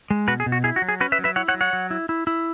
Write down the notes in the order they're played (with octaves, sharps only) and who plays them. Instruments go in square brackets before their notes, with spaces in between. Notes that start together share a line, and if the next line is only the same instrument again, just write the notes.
[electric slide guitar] G#3
B2 F#4 B4
G#4
B2
F#4
E4 G#4
F#4
F#3
G#4
C#4 F#4 B4
B4 E5
F#3
B4 E5
E4 C#5 F#5
C#5 F#5
F#3
C#5 F#5
F#3
E4
E4
E4